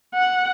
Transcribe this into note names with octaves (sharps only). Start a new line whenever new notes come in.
F#5